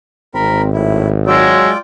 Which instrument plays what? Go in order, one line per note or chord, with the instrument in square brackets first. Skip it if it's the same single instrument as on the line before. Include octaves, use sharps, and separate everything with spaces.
[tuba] G#1 [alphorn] C4 [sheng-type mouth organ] A#4 B5
[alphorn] A2 [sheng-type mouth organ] E4
[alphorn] F#3 [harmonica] G#3 E6 [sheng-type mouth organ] F4 D5 G5